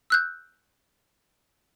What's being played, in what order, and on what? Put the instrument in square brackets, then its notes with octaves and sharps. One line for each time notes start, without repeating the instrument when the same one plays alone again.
[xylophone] E6 F#6 G6